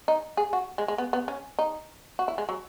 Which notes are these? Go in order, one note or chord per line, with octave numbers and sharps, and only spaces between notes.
D#4
G#4
F#4
G#3
G#3
B3
B3
C#4
D#4
F#4
E4
G#3
F#3